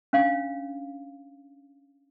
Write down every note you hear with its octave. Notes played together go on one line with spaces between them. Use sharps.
C#4 D4 F5